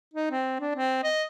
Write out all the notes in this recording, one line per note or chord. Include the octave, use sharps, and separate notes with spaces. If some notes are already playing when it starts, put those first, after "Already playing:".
D#4
C4
D4
C4
D#5